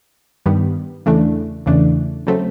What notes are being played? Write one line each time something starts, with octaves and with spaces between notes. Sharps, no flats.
G2 D#3 G3 B3
E2 C#3 E3 A3 D4
E2 C#3 E3 A3 D4
C#3 F#3 A3 C4